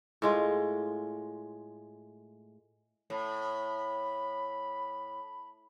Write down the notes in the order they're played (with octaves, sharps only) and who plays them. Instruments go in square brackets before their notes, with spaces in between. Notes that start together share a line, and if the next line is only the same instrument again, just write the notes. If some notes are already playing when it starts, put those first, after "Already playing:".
[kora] A2 G#3 F4
[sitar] A2 [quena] B5